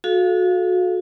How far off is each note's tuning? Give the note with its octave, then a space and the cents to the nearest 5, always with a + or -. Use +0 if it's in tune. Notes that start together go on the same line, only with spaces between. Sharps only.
F#4 -25 A4 -35 F5 +0